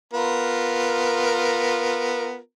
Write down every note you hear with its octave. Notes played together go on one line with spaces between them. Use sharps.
B3 F4 A#4